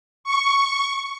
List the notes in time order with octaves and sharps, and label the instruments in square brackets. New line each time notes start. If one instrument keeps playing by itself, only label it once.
[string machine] C#6